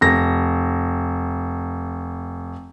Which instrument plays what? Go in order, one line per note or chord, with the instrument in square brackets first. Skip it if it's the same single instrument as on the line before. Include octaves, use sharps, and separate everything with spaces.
[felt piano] F1 A#6